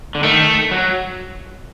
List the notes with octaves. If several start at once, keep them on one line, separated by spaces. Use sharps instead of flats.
D3
D#3 A3
F#3